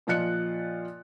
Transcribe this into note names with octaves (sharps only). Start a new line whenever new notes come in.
A#2 F3 F4 D#5 F#6 C#7